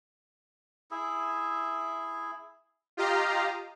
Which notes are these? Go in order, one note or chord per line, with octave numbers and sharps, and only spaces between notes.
E4 G#4 E5
F4 G4 D#5 F5 A#5